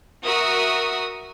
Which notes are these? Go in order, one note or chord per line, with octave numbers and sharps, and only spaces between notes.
F#4 A#4 E5 D#6